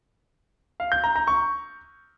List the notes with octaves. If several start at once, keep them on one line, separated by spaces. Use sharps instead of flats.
F5
G6
A#5
A#5
C#6